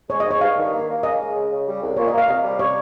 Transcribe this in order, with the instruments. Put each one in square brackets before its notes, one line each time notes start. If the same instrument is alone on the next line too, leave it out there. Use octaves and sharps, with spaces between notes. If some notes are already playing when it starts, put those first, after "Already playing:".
[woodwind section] G#3 [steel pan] C#5
[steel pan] D#5
[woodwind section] G#2
[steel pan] C#5
[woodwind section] G2 [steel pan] F5
[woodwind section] D#3
A#3
A#3
[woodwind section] C#4 [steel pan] D#5
[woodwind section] G#3
C#3
C#3
G3
C2
[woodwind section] A#2 [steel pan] C#5
[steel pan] D#5
[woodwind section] A#3
[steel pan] F5
[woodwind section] C3 [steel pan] D#5
[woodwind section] G3
[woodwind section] C3 [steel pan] C#5